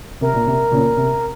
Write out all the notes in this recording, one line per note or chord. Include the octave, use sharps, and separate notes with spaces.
C3 A#4
A#2
C3
A#2 C#3
C3